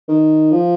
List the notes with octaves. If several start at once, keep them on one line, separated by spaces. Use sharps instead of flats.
D#3
F3